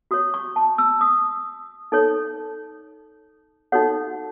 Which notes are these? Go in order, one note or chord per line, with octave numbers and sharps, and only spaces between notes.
F#4 C#5 D#6
C#6
A5
E6
D#6
D#4 A4 C#5
D#4 F#4 A4 C#5 F#5